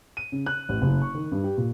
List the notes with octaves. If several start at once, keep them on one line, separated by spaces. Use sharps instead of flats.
D#7
C#3
F#6
A1
F#1
C#6
D#3
G2
G4
A#2